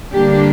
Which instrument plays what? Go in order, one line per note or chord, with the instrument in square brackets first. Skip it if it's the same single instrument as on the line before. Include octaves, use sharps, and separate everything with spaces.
[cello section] D3 G3 A#3 D4 G4